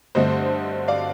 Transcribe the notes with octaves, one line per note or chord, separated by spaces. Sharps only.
G2 D3 A3 C4 C5 D#5
D5 F5